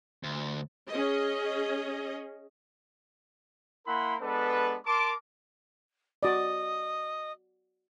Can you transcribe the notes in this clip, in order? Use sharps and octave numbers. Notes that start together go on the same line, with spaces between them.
D2
C#4 G#4 D#5
A#3 E4 A#4 F#5 B5 C6
G#3 B3 D4 A4 B4
A#4 A5 C6 D6
F#4 D5 D#5